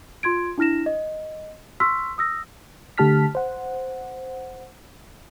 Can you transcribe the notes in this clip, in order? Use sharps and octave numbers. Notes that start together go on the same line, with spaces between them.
F4 C6 G#6 D7
D4 E4 F6 A#6 E7
D#5
C6 C#6 E6 F6 B6
D#6 E6 A#6
D3 A3 G4 A5 F6 B6
C5 F#5